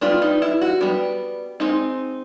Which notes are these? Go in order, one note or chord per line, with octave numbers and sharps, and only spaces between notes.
G3 B3 D4 F4
D#4
E4
F#4
G3 B3 D4
G#3 C4 D#4